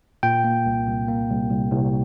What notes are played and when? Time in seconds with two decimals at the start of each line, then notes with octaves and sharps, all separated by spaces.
0.23 A#2 G5
0.44 A#3
0.66 C2
0.87 C2
1.08 A#3
1.29 C2
1.50 C2
1.71 C2